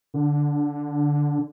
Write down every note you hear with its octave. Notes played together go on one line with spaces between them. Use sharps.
D3